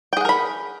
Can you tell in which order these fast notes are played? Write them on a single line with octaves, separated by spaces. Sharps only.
G5 G#4 F#5 A#4 B5